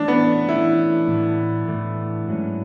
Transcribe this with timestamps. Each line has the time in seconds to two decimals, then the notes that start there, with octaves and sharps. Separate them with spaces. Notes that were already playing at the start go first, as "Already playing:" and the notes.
Already playing: E3 A3 C#4 D4
0.08 B3
0.48 E3 A3 C#4 E4
1.07 A2 E3 A3
1.67 A2 E3 A3
2.27 G#2 F#3 C#4